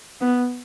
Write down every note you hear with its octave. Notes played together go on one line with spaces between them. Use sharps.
B3